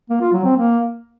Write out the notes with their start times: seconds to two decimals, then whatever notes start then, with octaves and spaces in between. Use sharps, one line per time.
0.10 A#3
0.21 F4
0.33 F#3
0.44 C4
0.56 A#3